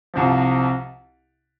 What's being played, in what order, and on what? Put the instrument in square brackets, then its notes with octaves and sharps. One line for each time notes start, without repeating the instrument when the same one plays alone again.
[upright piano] C2 C3 F3